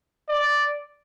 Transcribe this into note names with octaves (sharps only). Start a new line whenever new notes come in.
D5